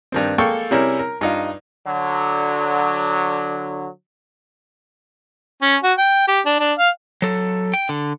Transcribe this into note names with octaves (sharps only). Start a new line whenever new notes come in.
G2 D#3 C4
G#3 A#3 A4 G5 C#6
C3 G3 C#4 E4 G#4 A#4
A#4
G2 D#4 F4
D3 F#3
C#4
F#4
G5
G4
D4
D4
F5
F#3 A4
G5
D3